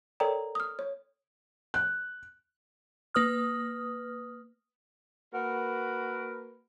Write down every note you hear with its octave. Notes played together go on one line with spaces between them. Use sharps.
A4 A#4 C#5 D5 G5 A#5
D#6 F6
C#5
F#6
A#3 B4 D#6 F6
A#3 F#4 A#4 B4